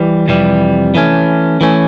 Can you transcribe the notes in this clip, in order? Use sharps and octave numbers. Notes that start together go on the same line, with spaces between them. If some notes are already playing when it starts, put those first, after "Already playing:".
Already playing: E3 G3
F2 C3 E3 G3
E3 A3 C#4
E3 A3 C#4